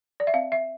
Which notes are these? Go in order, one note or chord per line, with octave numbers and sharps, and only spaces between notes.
D5
E5
C4 F5
E5